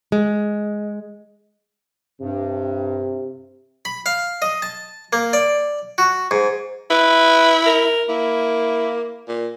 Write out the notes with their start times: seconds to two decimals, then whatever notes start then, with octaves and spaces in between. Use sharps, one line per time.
0.12 G#3
2.21 G2 C3
3.85 B5
4.06 F5
4.42 D#5
4.62 A5
5.13 A#3
5.33 D5
5.98 F#4
6.31 G#2
6.91 E4 B4
7.66 A#4
8.09 A#3 E4
9.28 A#2